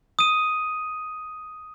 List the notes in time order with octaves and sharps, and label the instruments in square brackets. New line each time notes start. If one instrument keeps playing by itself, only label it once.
[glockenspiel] D#6 D#7